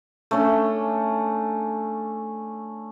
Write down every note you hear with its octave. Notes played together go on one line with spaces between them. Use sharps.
A3 C#4 D4